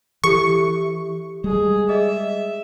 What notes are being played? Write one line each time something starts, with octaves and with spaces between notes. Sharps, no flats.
E3 G4 A4 C#6
G3 G#3 G#4
G#4 D#5 E5